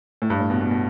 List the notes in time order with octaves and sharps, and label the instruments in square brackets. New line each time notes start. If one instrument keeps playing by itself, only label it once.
[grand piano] A2
G2
A2
B2
B2
B2